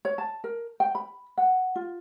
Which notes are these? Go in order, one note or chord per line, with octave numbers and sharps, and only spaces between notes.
C#5
A5
A#4
G5
B5
F#5
F4